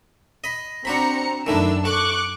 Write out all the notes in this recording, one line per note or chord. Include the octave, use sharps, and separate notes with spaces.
D#5 B5
C4 D4 F#4 A#5 B5 C#7
F#2 D#3 A3 D4 E4 E6
A4 C#6 D6 F#6